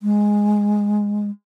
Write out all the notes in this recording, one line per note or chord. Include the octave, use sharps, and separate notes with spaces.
G#3